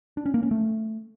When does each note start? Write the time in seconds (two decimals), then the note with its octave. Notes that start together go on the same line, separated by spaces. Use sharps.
0.17 D4
0.26 C#4
0.34 A#3
0.43 C#4
0.51 A3